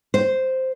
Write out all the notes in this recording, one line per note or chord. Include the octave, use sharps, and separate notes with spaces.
C5